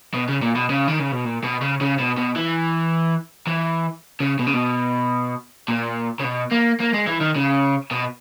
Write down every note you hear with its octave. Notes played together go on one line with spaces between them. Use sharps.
B2
C#3
A#2
B2
C#3
D#3
C#3
B2
A#2
B2
C#3
C#3
B2
B2
E3
E3
C#3
B2
C#3
B2
A#2
C#3
B2
A#3
A#3
G#3
E3
D#3
C#3
B2